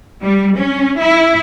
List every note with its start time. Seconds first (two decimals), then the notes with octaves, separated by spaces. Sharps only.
0.23 G3
0.58 C#4
1.00 E4